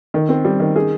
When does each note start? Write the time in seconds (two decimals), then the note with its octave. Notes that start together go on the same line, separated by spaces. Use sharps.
0.14 D#3
0.29 C4
0.45 G3
0.60 D#3
0.76 G#4